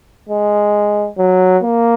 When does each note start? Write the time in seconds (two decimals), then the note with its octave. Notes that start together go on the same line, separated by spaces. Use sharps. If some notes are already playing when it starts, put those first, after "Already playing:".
0.29 G#3
1.17 F#3
1.63 A#3